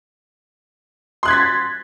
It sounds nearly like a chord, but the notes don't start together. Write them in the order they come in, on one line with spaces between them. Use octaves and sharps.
C6 F#6 G#6 B6 A6